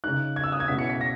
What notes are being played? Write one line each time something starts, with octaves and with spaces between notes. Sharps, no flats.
C#3 G#3 D#4 F#6
G#6
E6
D#6
G#6
B2 G#3 C#4 E4 B6
C#7
B6
A#6